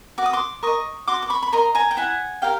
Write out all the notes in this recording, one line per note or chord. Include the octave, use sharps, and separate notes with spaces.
F#4 D6
D#6
C6 D6
A#4 D#5 C#6 D#6
F#4 C6 D6
D6
B5 C#6
B5
A#4 D#5 A#5 C6
G#5 A#5
G5
E4 F#5 G#5
G4 A#4 F5 G5